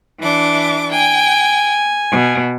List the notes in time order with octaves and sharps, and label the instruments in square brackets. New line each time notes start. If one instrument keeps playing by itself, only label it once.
[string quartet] E3 D4 D6
[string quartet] G5 [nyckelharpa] G#5
[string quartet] B2